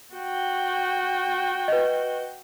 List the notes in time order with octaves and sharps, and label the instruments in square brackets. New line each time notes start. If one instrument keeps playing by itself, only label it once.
[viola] F#4 G5
[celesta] B4 D#5